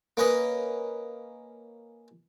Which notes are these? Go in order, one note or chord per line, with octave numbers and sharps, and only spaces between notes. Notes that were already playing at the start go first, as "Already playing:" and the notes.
A#3 C#4 B4 D#5